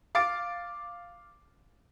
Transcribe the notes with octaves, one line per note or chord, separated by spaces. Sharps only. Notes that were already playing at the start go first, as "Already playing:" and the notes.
F5 D6 A6 D7